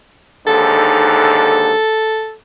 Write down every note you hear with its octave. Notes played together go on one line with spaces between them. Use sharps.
D#2 G#2 D3 A4